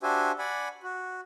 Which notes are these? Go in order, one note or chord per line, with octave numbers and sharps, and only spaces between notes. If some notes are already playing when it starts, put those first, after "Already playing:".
D4 F#4 G4 C5 E5 G#5
D5 F#5 G#5 B5
F#4